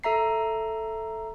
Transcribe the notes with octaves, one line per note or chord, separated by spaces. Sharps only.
A4 E5 A#5 C7